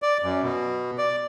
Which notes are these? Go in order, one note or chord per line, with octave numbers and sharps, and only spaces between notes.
D5
F#2
B2
D5